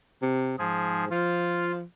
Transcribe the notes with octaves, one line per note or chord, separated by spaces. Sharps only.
C3
G#2 F3 G#4
F3 F4